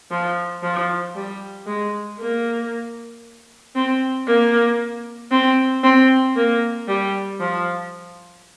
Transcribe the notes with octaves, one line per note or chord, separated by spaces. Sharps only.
F3
F3
G3
G#3
A#3
C4
A#3
C4
C4
A#3
G3
F3